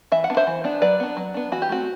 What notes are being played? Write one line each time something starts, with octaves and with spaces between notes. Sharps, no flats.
E3 E5
F#5
B3 D4
C5 E5
E3
B3 D4
F#3 B4 D5
B3 D4
F#3
B3 D4
E3 F#4
G4
A3 C4 F#4